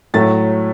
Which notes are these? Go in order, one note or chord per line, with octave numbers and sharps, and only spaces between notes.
A2 F#3 A3 A6